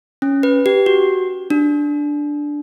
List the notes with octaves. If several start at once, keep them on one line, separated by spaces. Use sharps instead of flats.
C#4
B4
G4
F#4
D4